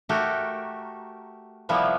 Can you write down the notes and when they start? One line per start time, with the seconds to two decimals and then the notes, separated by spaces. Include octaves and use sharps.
0.09 A3 F#4 G4 A4 A#4
1.69 C3 F3 G3 A#3 B3 E4